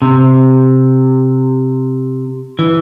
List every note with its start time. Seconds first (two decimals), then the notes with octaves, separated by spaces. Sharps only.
0.02 C3
2.59 E3